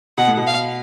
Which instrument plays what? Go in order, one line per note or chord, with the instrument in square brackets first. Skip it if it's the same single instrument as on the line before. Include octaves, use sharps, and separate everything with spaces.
[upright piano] B2 [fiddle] F#5
[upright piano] A2
B2
[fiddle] F5